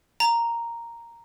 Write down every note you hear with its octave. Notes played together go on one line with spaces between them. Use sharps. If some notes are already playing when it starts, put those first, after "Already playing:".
A#5